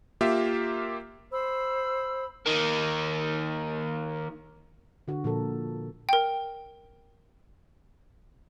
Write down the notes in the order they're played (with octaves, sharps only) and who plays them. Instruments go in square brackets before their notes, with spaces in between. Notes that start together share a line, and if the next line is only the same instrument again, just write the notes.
[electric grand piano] A#3 F4 G4 E5
[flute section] C5 B5 E6
[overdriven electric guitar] D#3 A#3
[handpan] D3 F#4
A#2 F3 A4 A#4
[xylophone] A#4 G5